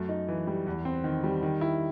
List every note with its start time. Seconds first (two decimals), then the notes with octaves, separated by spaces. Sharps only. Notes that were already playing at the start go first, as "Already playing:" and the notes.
Already playing: F#2 A3
0.09 D#4
0.28 E3
0.47 G3
0.67 E2
0.85 C4
1.04 D#3
1.24 G3
1.43 D#3
1.61 E4